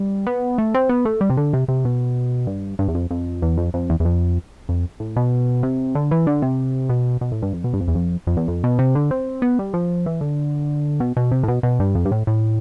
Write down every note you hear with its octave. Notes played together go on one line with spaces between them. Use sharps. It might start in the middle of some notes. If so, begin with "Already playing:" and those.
Already playing: G3
B3
A3
C4
B3
A3
G3
C3
D3
C3
C3
B2
G2
G2
E2
F2
F2
E2
F2
F2
E2
E2
F2
F2
A2
B2
C3
D3
E3
D3
C3
B2
B2
A2
G2
F2
B2
G2
F2
E2
F2
F2
E2
F2
B2
C3
D3
C4
B3
G3
F3
E3
D3
B2
B2
C3
A2
B2
B2
G2
F2
G2
A2
A2